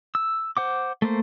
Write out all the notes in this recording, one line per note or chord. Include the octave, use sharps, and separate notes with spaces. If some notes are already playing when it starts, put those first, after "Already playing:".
E6
C5 F#5 D6
A3 A#3 C5